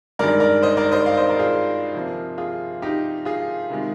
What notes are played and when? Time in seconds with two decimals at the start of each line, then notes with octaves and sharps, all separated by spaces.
0.19 G2 D#3 G#3 A#4 D5
0.40 A#4 D5
0.62 C5 D#5
0.77 A#4 D5
0.92 C5 D#5
1.06 D5 F5
1.17 C5 D#5
1.29 A#4 D5
1.39 F4 G#4
1.94 C3 F3 A#3
2.38 F4 G#4
2.82 D#4 G4
3.25 F4 G#4
3.70 C3 D#3 G#3